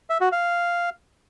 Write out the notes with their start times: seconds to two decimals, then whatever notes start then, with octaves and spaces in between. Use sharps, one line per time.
0.10 E5
0.21 F#4
0.32 F5